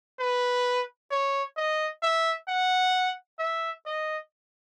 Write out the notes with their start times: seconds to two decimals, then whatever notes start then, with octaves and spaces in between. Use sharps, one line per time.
0.20 B4
1.11 C#5
1.57 D#5
2.02 E5
2.48 F#5
3.39 E5
3.86 D#5